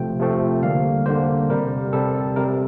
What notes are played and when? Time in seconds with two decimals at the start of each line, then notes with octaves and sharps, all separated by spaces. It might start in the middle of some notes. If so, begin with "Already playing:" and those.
Already playing: C3 F3 A3 C4 G5
0.19 C3 F3 A3 C4
0.63 D3 G3 A#3 F5
1.06 D3 G3 A#3 C5
1.50 C3 G3 C4 A#4
1.93 C3 G3 C4 A4
2.36 C3 G3 C4 A#4